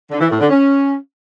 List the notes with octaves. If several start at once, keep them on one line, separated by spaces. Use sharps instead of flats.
D3
E3
A2
D3
C#4